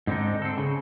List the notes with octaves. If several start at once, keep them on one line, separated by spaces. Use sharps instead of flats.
G#2 D3 C4 D4 D#4
C4 A4
C#3